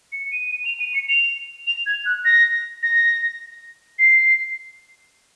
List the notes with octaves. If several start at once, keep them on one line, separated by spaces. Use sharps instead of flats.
C#7
D#7
D#7
F7
D#7
C#7
F7
F7
G#6
F#6
A#6
A#6
C7